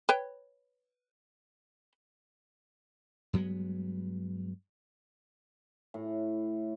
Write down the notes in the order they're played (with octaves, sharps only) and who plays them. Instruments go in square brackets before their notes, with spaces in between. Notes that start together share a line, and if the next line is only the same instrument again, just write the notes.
[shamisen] B4 C#5 G5
[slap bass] G2 F#3 G#3 B3
[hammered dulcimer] A2